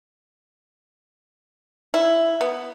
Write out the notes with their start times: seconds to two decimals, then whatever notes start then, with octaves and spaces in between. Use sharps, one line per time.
1.94 E4
2.41 B3